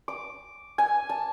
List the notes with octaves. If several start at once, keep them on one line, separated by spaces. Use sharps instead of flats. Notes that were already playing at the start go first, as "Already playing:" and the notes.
D6
G#5
A5